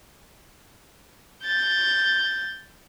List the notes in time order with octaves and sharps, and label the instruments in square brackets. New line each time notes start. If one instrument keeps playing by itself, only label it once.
[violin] G6 A6